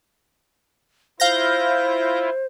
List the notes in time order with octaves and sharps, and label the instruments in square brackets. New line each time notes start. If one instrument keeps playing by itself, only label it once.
[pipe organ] E4 F4 [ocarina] C5 [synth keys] F5 G6 A#6